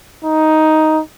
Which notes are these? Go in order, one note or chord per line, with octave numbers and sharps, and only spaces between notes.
D#4